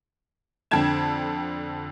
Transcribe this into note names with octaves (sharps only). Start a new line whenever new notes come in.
F2 D3 G5 A5 G#6 E7